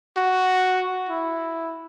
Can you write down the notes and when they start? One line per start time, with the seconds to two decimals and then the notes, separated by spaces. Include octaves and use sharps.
0.17 F#4
1.09 E4